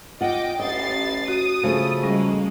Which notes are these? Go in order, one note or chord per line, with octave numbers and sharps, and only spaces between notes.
F4 D#5 F#5 G5 D6
A1 D#5 A6 C7
F#4 D#6
C#3 F3 A3
G3 G#3 A#3 C#4